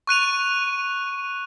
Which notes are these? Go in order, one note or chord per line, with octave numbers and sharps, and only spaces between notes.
C#6 F#6 D#7 F7